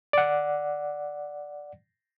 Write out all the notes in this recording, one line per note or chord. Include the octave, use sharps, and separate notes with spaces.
D5 F#5